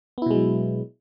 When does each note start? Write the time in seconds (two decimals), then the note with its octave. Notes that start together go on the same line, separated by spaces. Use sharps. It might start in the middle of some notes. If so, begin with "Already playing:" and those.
0.18 B3
0.22 E4
0.26 B2
0.31 G#3
0.35 F#3